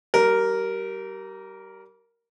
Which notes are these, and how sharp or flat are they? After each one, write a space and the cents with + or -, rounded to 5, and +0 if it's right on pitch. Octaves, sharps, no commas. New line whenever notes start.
G3 -30 A#4 +0